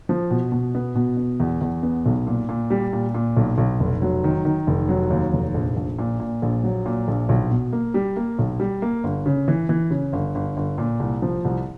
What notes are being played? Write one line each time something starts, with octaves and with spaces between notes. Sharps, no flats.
F3
B2
B2
B3
B2
B3
E2
E2
B3
B1
A#2
A#2
G3
A#2
A#2
B1
B1
F1
F#3
D#3
D#3
F1
F#3
D#2
F1
A#1
A#1
A#2
A#2
A#1
F#3
A#2
A#1
B1
B2
A#3
G3
A#3
B1
G3
A#3
G1
C#3
E3
E3
C#3
G1
G1
G1
A#2
C2
F3
C2